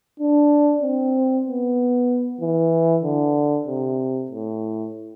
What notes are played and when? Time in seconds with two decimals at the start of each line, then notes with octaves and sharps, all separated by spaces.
0.19 D4
0.83 C4
1.46 B3
2.41 E3
3.03 D3
3.67 C3
4.30 A2